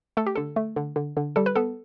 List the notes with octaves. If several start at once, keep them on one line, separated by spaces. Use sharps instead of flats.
A3 A4
G4
D3 A4
A3
D3
D3
D3
G3 A4
B4
B3 A4